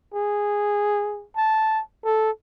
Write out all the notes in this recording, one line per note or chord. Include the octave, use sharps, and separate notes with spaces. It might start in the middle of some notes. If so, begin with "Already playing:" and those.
G#4
A5
A4